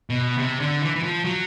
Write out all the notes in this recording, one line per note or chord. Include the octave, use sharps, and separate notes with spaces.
B2
C3
D3
E3
E3
F3
F#3